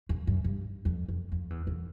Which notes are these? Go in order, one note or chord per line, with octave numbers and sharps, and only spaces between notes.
F2
F#2
G2
F2
F2
F2
E2
F2